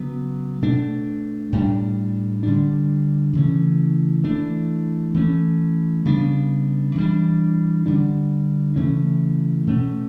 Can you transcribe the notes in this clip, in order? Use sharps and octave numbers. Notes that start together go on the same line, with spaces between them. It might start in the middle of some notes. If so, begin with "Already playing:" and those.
Already playing: C#3 F#3 B3
B2 A3 D4
A2 G3 D4
D3 G3 D4
C#3 E3 A3 C#4
E3 A3 D4
E3 A3 C#4
C#3 G3 B3 D4
E3 G3 D4
D3 G3 D4
C#3 E3 A3 C#4
B2 A3 C#4